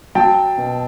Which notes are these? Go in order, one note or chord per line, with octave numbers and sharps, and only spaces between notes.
F#3 G5 A5
B2